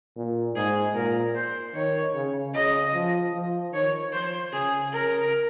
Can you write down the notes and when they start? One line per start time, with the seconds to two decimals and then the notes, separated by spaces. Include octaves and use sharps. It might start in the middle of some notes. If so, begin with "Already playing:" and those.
0.16 A#2
0.55 G#2 G#4
0.94 A#2 A#4
1.35 C5
1.74 D#3 C#5
2.14 C#3
2.54 C#3 D#5
2.94 F3
3.33 F3
3.73 D#3 C#5
4.13 F3 C5
4.52 C#3 G#4
4.92 C#3 A#4